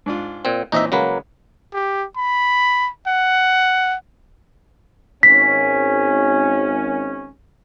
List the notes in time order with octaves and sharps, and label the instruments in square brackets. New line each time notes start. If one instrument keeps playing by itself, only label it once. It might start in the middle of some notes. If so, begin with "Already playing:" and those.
[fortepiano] G#2 D4 F4
[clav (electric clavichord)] A#2 C4
[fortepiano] A#2 E3 C4 [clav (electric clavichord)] D#4 D#5 E5
[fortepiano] C#3 G#3 [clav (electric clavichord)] F#3 A#3 B4
[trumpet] G4
B5
F#5
[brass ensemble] G#1 C#4 [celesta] B6